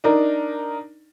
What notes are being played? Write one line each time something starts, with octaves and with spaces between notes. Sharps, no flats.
D4 D#4 A#4